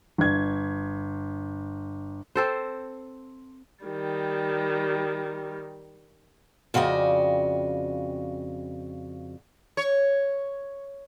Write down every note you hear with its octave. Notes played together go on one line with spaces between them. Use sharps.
G1 G#6
C4 A4 C5
D#3 G3
F2 C#3 F#4 D5 D#5 G5
C#5